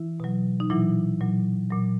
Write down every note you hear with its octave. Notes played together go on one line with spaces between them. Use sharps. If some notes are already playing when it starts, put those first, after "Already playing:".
Already playing: E3 E4
B2 F#3
D#4
A#2 E3 F#3 E4
A#2 F#3
A#2 F#3